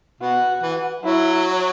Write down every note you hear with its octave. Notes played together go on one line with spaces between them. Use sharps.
B2 F#4
E3
F#3 E4